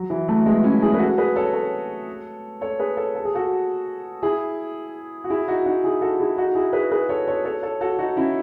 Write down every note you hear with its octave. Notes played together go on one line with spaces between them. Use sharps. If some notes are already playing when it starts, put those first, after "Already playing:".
Already playing: F#3
E3
F#3 A3
G#3 B3
C#4 E4
E4 G#4
B4
F#4 A4
G#4 B4
A4 C#5
A4 C#5
A4 C#5
G#4 B4
A4 C#5
A4
G#4
F#4 A4
E4 G#4
F#4
E4 G#4
D#4 F#4
D#4 F#4
E4 G#4
F#4 A4
E4 G#4
D#4 F#4
E4 G#4
G#4 B4
G#4 B4
A4 C#5
A4 C#5
A4 C#5
A4 C#5
F#4 A4
D#4 F#4
C#4 E4